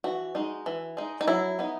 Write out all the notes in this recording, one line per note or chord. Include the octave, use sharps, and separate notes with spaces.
E3 F#4
G#3 D#4
E3
G#3 D#4
D#4
F#3 E4
B3 D#4